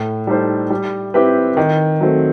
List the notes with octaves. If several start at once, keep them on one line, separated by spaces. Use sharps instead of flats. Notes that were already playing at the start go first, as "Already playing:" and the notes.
Already playing: A2
G3 D#4 A4 C5
G3
C4 E4 G4 B4
D#3
F#3 A3 C4